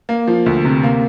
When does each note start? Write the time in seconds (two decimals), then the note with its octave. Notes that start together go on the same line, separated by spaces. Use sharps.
0.09 A#3
0.28 F3
0.46 D2
0.65 C3
0.83 A#3